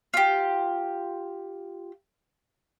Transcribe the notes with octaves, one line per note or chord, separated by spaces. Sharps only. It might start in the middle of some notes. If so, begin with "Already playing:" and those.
F4 G4